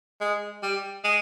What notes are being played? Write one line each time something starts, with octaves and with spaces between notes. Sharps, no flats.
G#3
G3
G#3